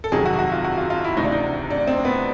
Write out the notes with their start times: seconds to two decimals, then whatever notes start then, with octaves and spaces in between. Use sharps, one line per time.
0.04 A4
0.12 F2 C3 D#3 F#3 G#4
0.26 F#4
0.39 F#4
0.52 F4
0.64 F#4
0.78 F4
0.90 F4
1.04 E4
1.17 D2 C3 E3 D#4
1.24 D4
1.32 D#4
1.70 D4
1.87 C4
2.05 B3